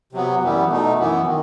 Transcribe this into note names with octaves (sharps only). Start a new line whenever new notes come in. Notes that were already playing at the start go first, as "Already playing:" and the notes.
C3 F#3 B3
F#2 E3 G3 B3
B2 A3 D#4
F#2 E3 B3
D#3